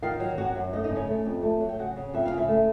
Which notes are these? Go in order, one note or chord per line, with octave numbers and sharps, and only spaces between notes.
D#3 F4 F5
F#3
F#2 F#4 F#5
F#2
A3 D#4 D#5
D#4 D#5
C#3
C#4 C#5
A3
F2
A3
F#3
G5
C#3 F#4 F#5
C#3
F2 E5
F5
C#3
E4 E5
A3